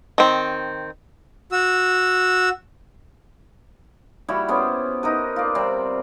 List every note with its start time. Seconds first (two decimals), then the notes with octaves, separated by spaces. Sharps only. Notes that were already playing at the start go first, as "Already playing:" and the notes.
0.18 D#3 C4
1.52 F#4 E6
4.28 G3 E4 F#4
4.48 B3 C#4 G4 C5
5.03 D#4 A#4 B4
5.36 F4 D5
5.55 C3 G3 C4